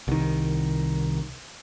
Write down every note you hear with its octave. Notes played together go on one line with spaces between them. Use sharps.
C2 D#3